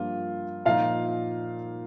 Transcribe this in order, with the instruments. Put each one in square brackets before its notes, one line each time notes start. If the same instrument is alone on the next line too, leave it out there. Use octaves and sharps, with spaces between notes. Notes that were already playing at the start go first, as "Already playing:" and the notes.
Already playing: [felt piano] G2 F3 A#3 [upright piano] F4
[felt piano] A#2 F3 D#4 [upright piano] F4 F5